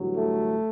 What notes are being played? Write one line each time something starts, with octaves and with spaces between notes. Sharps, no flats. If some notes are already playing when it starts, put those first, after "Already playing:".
Already playing: A1 G2 D3 F#3
A3